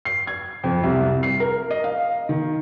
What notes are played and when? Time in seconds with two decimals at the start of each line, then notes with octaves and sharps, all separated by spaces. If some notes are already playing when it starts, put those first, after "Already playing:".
0.05 C7
0.27 G#6
0.64 F2
0.84 C2
1.23 C7
1.40 A#4
1.70 D#5
1.84 F5
2.29 D#3